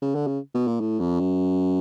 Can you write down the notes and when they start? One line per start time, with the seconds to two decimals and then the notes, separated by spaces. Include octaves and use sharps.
0.02 C#3
0.15 D3
0.27 C#3
0.55 B2
0.67 A#2
0.80 A2
1.00 F2
1.20 F#2